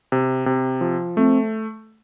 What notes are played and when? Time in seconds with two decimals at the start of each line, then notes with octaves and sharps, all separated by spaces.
0.12 C3
0.46 C3
0.81 F3
1.17 A3 C4